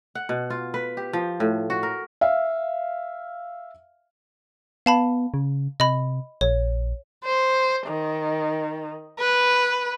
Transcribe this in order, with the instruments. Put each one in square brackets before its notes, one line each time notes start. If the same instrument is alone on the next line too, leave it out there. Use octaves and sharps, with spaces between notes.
[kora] F#5
B2
F4
B4
G4
F3
A2
F#4
A#4
[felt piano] E5 F5
[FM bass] B3 [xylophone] F5 A5 B5
[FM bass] C#3
[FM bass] C3 [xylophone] D#5 B5
[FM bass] A#1 [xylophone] C#5
[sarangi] C5
D#3
B4